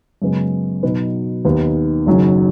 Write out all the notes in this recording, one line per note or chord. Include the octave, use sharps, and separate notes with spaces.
F#2 C#3 G#3 B3
B2 F#3 D#4 B4
D#2 D#3 B3
F#1 F#2 D#3 F#3